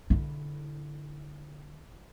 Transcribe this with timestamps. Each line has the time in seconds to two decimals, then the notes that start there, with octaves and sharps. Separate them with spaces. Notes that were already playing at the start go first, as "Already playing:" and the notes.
0.10 D3 E4